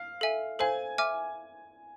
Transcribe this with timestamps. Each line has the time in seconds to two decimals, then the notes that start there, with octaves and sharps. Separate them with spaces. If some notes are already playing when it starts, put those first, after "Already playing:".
Already playing: F5
0.21 A4 E5 G#5
0.59 A4 C5 F5 G#5
0.98 E5 G#5 D6 F6